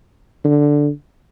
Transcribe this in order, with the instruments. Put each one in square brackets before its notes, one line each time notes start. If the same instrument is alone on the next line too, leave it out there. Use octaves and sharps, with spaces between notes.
[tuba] D3